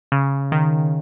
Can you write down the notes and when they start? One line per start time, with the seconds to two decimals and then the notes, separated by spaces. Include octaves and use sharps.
0.12 C#3
0.52 D#3